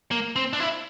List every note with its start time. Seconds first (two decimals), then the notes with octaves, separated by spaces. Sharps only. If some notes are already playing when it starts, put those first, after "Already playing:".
0.11 A#3
0.36 C4
0.53 D4
0.60 E4